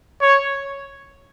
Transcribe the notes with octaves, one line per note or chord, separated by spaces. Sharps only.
C#5